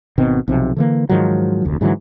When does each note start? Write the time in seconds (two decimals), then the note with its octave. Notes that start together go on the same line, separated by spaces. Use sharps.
0.18 G#1 B2 D#3 C4
0.48 B1 C3 F3
0.77 D3 E3 A#3
1.09 G#2 D#3 F3 F#3
1.64 F1 D2
1.81 G#2 D3 E3 F#3